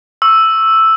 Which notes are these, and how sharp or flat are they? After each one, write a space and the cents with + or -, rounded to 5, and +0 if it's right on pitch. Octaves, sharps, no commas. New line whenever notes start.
C#6 +0 E6 +0